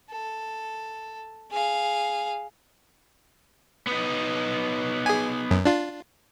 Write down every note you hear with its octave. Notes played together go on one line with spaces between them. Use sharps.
A4
G#4 F5
B3 D#4
G#4 G#5
F#2
D4 F4